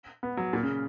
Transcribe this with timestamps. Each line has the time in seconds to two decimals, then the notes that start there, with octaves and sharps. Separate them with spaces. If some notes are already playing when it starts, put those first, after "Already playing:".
0.23 B3
0.37 F#3
0.53 A#2
0.63 C#3